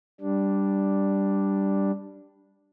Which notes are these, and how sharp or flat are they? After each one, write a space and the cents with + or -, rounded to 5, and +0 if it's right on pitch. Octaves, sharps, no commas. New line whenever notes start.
G3 +0 D4 +0